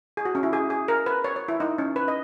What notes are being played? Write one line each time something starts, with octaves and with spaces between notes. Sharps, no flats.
G#4
F#4
C#4
E4
G#4
G#4
A#4
B4
C#5
C#5
E4
D#4
C#4
B4
D#5